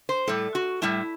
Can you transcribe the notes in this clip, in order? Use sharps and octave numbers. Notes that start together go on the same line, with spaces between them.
C5
A2 G3 A4
F#4
A2 G3 E4